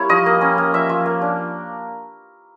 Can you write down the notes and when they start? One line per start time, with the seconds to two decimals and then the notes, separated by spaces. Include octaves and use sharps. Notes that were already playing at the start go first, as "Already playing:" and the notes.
Already playing: G3 A#3 C4 E4 C#5
0.09 F3 D#5
0.26 A#3
0.41 C#4
0.58 A#3
0.74 F3 E5
0.89 F3
1.06 A#3
1.22 D4